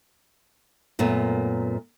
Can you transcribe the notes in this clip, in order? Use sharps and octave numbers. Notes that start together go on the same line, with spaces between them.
F#2 A#2 A3 B3